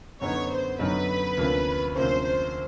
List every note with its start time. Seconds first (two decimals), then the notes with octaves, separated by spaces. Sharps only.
0.21 F#2 D3 F#3 B3 D#4 C#5
0.50 C5
0.79 F#2 D3 F#3 B3 D#4 B4
1.37 D2 C3 F3 A#3 C#4
1.95 D2 C3 F3 A#3 C#4 C5
2.24 C5